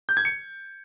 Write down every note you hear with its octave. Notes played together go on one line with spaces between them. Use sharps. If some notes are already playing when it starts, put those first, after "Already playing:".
G6
G#6
C#7